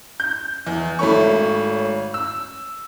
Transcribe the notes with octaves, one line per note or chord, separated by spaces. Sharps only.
G6
E2
G#1 A3 C#5 B5 C#6
E6